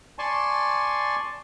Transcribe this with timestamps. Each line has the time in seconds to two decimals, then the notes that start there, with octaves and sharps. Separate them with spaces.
0.19 D5 G#5 A5 C6 C#6